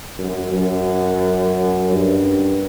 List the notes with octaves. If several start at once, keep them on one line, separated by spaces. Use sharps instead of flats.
F#2
F#2
G2